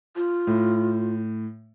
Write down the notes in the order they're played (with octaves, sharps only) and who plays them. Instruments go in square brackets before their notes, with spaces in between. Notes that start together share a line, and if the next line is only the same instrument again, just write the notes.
[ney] F4
[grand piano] A2